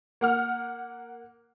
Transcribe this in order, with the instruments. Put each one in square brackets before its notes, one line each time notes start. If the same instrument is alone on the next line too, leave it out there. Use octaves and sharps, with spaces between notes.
[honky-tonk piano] A#3 F#5 F6